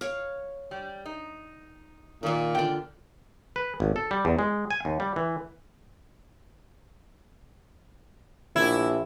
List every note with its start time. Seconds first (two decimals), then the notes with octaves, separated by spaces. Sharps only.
0.01 C#5 F5
0.71 G3
1.05 D#4
2.23 A#2 D#3 A#3
2.55 D3 F4 D5 G5
3.56 B4
3.80 G#1
3.96 A4
4.11 G3
4.25 E2
4.39 G#3
4.71 G#5
4.85 D#2
5.00 G3
5.16 E3
8.56 A#1 E4